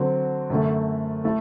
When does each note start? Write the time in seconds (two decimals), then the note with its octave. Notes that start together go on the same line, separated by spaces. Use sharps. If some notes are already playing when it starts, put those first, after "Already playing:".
Already playing: D3 F#3 C4
0.50 F#2 D3 A3
1.24 A3 E4 A4